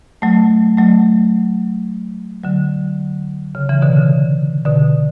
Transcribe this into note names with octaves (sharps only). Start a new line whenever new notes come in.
F#3 A3
F#3 A3
D3 F#3
C#3
C#3 E3
B2 D3
C#3
B2 D3